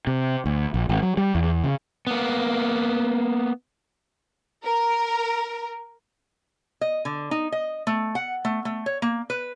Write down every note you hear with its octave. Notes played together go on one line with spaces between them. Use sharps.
C3
D2
A#1
G#1
F#3
G3
E2
C#3
A#3 B3
A#4
D#5
D3
D#4
D#5
A3
F#5
A3
A3
C#5
A#3
B4